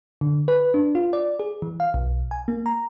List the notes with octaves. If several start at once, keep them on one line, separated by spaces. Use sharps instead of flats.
D3
B4
D4
F4
D5
G#4
E3
F5
B1
G#5
A#3
A#5